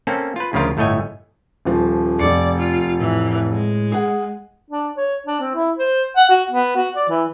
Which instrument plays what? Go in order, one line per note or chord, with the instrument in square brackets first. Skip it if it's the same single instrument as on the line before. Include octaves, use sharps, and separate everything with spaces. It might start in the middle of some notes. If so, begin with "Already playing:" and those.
[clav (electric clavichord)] A#3 C4 C#4 A4
F4 B4
D2 C#3 F3 F4 A#4
G1 A2 A3 C#5 D#5 G#5
[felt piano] D#1 F3
[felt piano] F1 C#7 [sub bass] F2 [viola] D5
[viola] F4
[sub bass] A2 [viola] E3
[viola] G#3
[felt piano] G#4 F#5
[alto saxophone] D4
C#5
D4
C4
E4
C5
F#5
F#4
B3
F#4
D5
E3